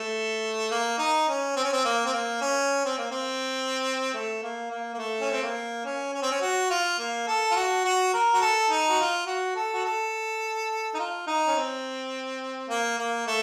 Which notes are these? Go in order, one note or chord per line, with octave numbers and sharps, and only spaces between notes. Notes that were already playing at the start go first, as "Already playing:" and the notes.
Already playing: A3
A#3
D#4
C#4
C4
C#4
C4
A#3
C4
A#3
C#4
C4
A#3
C4
A3
A#3
A#3
A#3
A3
C#4
C4
A#3
C#4
C#4
C4
C#4
F#4
F4
A#3
A4
F4
F#4
F#4
A#4
F#4
A4
D#4
F#4
F4
F#4
A4
F#4
A4
D#4
F4
D#4
C#4
C4
A#3
A#3
A3